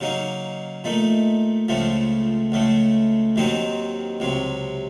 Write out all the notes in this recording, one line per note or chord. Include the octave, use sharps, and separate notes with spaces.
C#3 F#3 A#3 D#4
A#2 A3 D#4
C#2 C#3 F3 A3
C#2 C#3 A3
D#2 D#3 F#3 C4 D#4
C#2 C3 F#3